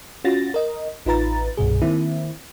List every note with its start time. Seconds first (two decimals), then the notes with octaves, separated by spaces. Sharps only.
0.24 C#4 F4 F#4 A6 A#6
0.54 A#4 D#5
1.05 A1 D#4 F4 B4 A#5 A6
1.57 C2 G2 B2 G#4
1.82 D#3 A#3 C4 E4